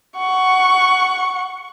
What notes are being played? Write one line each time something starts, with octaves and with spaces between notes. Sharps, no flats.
F#5 C#6